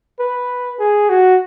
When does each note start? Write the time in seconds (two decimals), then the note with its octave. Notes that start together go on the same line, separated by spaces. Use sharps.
0.19 B4
0.80 G#4
1.09 F#4